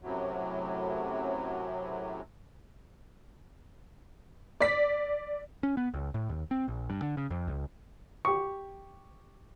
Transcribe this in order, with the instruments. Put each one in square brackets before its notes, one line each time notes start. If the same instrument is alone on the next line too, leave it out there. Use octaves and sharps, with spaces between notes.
[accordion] F#2 A2 C3 F#3
[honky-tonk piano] D5 B6
[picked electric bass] C#4
B3
C#2
A2
D#2
C4
A#1
G2
D3
C#3
F2
C#2
[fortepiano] G4 C#6